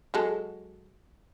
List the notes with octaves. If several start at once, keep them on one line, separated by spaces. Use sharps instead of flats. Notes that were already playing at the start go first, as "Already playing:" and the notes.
F#3 G#3 A4